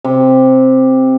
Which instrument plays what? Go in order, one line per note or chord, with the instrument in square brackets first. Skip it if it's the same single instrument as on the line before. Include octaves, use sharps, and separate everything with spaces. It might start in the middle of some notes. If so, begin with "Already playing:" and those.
[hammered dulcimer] C3